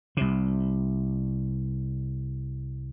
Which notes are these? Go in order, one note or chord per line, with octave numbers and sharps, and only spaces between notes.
C2 C3